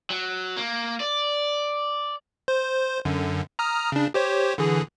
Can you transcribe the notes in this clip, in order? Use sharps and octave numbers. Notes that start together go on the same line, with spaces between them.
F#3
A#3
D5
C5
F#2 D3
A#5 D#6 F6
C#3 D4
G4 C5 C#5
D3 E3 G#4